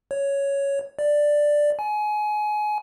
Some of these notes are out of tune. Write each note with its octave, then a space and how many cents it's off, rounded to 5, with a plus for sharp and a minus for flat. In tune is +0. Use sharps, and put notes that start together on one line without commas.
C#5 +5
D5 +5
G#5 +25